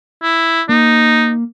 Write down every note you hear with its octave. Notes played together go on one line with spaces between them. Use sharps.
E4
A#3 D#4